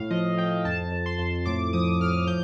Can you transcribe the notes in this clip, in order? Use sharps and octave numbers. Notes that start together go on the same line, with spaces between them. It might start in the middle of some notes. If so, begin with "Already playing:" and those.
Already playing: A2 F5
F3 D#5
F3 G5
F2 A5
F2
C6
F2
A2 D6
F3 D#6
A2 F6
F3 G6